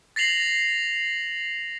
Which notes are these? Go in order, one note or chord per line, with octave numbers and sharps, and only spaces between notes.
A6 A#6 C7 F7 F#7